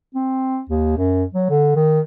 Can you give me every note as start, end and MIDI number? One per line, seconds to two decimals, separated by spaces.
0.15 0.60 60
0.69 0.94 39
0.97 1.24 42
1.34 1.46 54
1.50 1.74 50
1.76 2.01 51